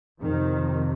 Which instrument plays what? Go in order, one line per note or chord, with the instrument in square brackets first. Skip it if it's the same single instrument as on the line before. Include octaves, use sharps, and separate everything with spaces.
[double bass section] F2 C3 D#3